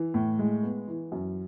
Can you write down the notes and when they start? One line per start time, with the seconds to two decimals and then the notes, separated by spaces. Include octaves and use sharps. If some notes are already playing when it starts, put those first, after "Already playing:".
Already playing: E3
0.14 A2
0.39 G#3
0.63 B3
0.88 E3
1.12 F#2